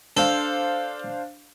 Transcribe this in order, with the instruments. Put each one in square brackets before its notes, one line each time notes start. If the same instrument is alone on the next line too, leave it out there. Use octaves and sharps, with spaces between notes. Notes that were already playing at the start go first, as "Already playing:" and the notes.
[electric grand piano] D4 C5 F5 [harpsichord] A4